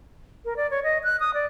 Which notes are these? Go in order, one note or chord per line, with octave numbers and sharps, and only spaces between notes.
A#4
D5
C#5
D#5
F#6
D#6
D5